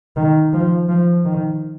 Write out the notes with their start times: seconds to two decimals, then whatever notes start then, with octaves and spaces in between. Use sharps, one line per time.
0.17 D#3
0.54 F3
0.89 F3
1.25 D#3